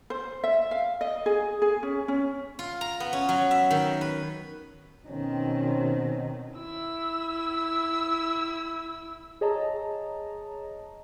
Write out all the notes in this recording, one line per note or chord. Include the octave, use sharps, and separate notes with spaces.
C5
E5
F5
D#5
G#4
G#4
C#4
C#4
F4
A#5
B3
C#4
F#3
E5
D#3
B4
B2 D#3 C4 C#4
E4 E6
G#4 C#5 D#5 A5 A#5